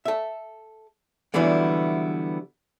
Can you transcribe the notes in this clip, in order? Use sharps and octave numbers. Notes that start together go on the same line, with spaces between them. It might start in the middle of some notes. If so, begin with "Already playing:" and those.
A4 E5
D3 E3 F#3 G3 B3 E4